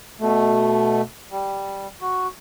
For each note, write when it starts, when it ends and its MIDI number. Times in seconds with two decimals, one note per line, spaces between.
0.20 1.01 47
0.20 1.01 57
1.31 1.87 55
2.01 2.27 66